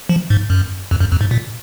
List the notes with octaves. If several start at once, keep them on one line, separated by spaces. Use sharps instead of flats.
F3
G#2
F#2
F2
F#2
F2
G#2
A#2